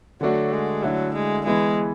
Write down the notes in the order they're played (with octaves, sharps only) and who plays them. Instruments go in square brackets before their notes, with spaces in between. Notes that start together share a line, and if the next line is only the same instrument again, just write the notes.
[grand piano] D3 A3 D4 F#4 [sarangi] F#3
[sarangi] G#3
[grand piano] D3 A3 E4 [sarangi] F#3
[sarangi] G#3
[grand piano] E3 B3 E4 [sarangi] G#3